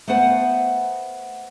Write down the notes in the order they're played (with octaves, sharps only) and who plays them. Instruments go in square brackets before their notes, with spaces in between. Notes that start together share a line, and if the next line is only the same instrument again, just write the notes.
[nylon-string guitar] A3 B3 C5 F#5 A5